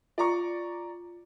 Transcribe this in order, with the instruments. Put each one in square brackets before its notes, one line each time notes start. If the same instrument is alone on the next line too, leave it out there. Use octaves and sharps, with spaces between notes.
[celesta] F4 [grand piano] D5 A#5 C#6